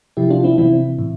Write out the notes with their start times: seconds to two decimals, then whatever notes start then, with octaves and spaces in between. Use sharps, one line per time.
0.17 C3 F3 E4 G4
0.30 D4 F4
0.44 C4 E4
0.58 C3 E3 C4 E4
0.99 A2